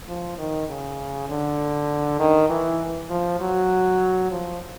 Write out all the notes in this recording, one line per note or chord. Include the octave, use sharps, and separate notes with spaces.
F3
D#3
C#3
D3
D#3
E3
F3
F#3
F3